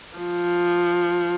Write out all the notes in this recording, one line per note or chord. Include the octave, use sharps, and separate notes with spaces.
F3